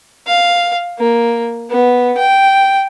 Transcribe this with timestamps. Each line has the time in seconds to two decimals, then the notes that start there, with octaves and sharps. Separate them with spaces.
0.27 F5
0.99 A#3
1.70 B3
2.17 G5